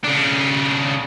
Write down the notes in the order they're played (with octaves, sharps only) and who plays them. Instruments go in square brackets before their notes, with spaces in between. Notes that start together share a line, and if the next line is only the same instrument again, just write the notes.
[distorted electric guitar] C#3 D4